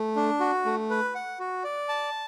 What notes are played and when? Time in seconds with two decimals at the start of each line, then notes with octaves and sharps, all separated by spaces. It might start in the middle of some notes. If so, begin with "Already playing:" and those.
Already playing: A3
0.16 D4
0.40 F#4
0.65 A3
0.90 B4
1.15 F#5
1.40 F#4
1.64 D5
1.89 A5